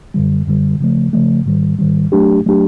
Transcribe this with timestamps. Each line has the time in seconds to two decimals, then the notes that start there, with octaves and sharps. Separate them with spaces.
0.14 F#2 D3 G3
0.47 F#2 D3 G3
0.80 C#3 F3 A3
1.13 C#3 F3 A3
1.46 G#2 D#3 G3
1.79 G#2 D#3 G3
2.12 F#3 A3 D4 G4
2.46 F#3 A3 D4 G4